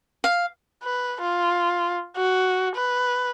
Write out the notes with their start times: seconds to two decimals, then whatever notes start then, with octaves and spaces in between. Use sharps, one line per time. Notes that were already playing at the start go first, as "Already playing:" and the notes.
0.24 F5
0.83 B4
1.21 F4
2.17 F#4
2.76 B4